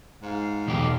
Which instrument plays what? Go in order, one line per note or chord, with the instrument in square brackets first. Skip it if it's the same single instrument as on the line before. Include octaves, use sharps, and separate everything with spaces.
[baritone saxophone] G#2 [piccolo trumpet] F5
[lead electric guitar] B1 [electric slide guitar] E2 G4